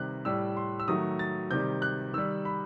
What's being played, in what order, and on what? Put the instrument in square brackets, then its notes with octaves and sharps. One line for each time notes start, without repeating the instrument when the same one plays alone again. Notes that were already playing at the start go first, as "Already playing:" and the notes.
Already playing: [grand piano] C3 D#3 G3 F#6
A2 G3 E6
C6
E6
D#3 F#3 A3 D#6
A6
C3 D#3 G3 G6
F#6
D#3 G3 E6
B5